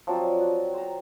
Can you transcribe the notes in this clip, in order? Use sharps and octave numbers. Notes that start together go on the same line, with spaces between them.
F3 F#3 C4 D5
F#4
C5 A#5